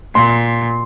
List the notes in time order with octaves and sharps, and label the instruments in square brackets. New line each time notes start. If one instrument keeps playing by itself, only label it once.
[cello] A#2 [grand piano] C6